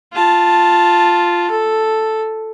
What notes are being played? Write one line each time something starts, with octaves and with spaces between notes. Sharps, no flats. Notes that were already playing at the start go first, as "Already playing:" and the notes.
F4 A5
A4